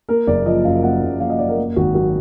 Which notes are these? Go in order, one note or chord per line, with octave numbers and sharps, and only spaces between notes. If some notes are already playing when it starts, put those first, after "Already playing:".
A#3 A#4
F#1 D5
F3 D#5
F#2 F5
A#3 F#5
F#1
F3 F5
D#5
F#2 D5
A#4
A#3
G#1 F#4
F#3 F#4